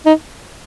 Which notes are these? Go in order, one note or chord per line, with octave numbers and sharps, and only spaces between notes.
D#4